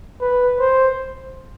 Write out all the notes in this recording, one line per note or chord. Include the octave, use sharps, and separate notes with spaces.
B4
C5